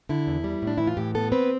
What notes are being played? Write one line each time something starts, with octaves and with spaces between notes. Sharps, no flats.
D3 E4
E2
G3
A2
D4
E3 E4
F4
A2 G4
B3 A4
C4 B4